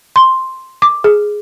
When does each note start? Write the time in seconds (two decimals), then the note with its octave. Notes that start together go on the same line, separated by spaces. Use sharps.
0.16 C6
0.82 D6
1.04 G#4